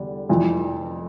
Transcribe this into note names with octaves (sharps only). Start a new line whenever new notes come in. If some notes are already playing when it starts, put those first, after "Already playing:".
Already playing: E2 D3 G3
F1 F2 E3